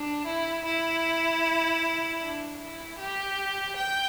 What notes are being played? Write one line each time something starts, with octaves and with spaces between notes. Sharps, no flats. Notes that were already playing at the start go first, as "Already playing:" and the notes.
Already playing: D4
E4
E4
D4
E4
G4
G5